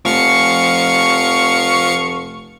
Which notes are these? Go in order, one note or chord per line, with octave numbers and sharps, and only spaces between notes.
F1 F3 F5 C#6 C#7